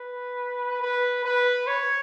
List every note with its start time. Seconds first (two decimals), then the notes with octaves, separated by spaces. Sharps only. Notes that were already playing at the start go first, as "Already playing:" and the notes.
Already playing: B4
0.82 B4
1.25 B4
1.67 C#5